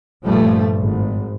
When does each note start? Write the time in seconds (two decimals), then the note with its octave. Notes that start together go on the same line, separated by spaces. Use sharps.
0.24 A#1 G2 F3 G3 A3
0.77 G#1